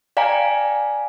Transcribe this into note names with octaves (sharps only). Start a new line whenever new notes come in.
D5 F5 G5 G#5 A#5